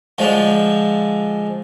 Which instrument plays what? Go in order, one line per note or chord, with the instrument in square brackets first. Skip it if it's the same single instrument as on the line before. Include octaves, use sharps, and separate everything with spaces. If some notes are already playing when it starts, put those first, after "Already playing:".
[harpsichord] D3 F3 G#3 F4